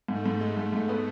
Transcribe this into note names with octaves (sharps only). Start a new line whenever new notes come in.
G#2 A3
G#2
G#3 A3
G#2
G#2
B3